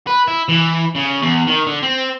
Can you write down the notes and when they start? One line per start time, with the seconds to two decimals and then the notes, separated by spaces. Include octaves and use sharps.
0.07 B4
0.28 E4
0.49 E3
0.95 C#3
1.22 E2
1.47 D#3
1.67 D3
1.83 C4